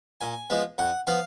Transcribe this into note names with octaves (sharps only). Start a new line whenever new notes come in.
A#2 G#5
F3 G#3 B3
F2 F#5
F3 B3 F5